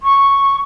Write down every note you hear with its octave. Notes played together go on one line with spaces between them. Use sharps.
C#6